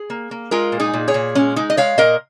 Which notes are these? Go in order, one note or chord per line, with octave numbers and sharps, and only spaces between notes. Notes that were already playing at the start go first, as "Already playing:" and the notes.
Already playing: G#4
A#3
A#3
G#3 F4 A#4
A#2
D#4 G#4
A#2
G#4 C#5
A#2
G#3 C#4
G#3 D#4
D#5
G#3 C#5 F5
A#2 A#4 D#5